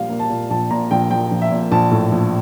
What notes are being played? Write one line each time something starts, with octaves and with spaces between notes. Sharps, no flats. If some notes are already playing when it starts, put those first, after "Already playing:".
Already playing: A#1 A#2 G3 F5
A#3
A5
A#2
A#1 A5
A#2 A#5
A#1 G5
F3 G5
A#1
E5
A#2
A#1 A5
A2
A#1